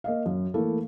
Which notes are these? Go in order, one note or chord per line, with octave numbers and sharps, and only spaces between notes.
A#3 D#5 F5
F#2
E3 A3 A#3 E4 A4